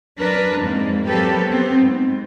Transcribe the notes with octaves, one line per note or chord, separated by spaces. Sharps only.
F#3 D4 A#4 B4
F2 G#2 G#3 A#3
F#3 A#3 C4 G4 A4 B4
B3 C4
G#2